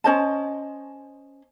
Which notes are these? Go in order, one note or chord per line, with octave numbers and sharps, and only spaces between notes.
C#4 C5 D#5 A5